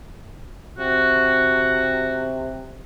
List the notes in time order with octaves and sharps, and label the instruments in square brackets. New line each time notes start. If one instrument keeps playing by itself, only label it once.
[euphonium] C3 [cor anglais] F#4